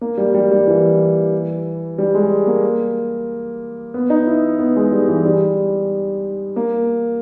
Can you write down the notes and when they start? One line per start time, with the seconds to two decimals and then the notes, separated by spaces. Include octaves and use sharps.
0.01 A#3
0.18 G3
0.34 G3
0.51 G3
0.67 E3
1.98 G3
2.15 G#3
2.47 A#3
3.94 B3
4.10 D#4
4.27 E4
4.59 B3
4.76 G#3
4.92 G3
5.08 E3
5.24 G3
6.56 A#3